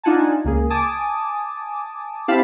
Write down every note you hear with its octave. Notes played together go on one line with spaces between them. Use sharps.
D4 D#4 F4 F#5 G#5 A5
C#2 A#3 G#4
G#5 A5 D6 D#6
C4 E4 G4 F5 A5 B5